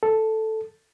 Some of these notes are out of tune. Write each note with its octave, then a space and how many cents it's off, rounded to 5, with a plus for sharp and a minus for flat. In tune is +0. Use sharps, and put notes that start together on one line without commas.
A4 +0